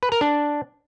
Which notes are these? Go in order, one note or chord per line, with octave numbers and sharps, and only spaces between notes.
B4
A#4
D4